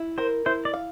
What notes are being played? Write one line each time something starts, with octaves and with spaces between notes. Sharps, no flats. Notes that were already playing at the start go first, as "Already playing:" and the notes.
Already playing: E4
A#4 C5
E4 C5
D5
F5